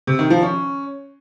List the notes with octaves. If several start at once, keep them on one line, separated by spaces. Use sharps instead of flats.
C3
D#3
F3
C#4